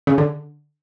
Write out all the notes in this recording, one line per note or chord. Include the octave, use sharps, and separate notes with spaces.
C#3
D3